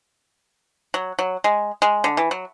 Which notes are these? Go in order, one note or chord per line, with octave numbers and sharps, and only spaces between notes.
F#3
F#3
G#3
G#3
D3
E3
F#3